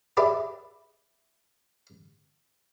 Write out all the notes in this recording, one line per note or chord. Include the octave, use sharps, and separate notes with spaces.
G4 G#4 B4 D5 E5